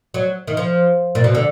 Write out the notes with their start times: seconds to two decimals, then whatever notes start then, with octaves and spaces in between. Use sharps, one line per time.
0.14 F#3
0.47 D#3
0.57 F3
1.15 A#2
1.24 B2
1.35 D3